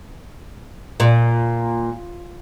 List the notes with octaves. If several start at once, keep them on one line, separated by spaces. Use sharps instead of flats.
A#2